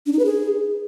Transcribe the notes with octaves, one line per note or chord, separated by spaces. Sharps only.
D4
D#4
B4
G#4